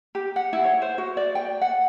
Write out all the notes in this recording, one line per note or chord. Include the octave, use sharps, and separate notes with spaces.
G4
F#5
E4
C#5
C5
F#4
D5
G5
F#5